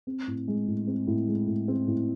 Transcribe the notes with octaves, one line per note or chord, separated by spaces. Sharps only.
C4
A2
G#3
A2
C4
A2
G#3
A2
C4
A2